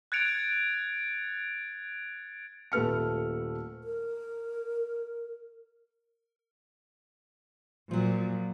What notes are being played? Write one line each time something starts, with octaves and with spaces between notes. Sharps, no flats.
F#6 G#6 A6 C#7 D7 F7
D#1 A3 B4 F6 C#7
A#4
A#2 F3 F#3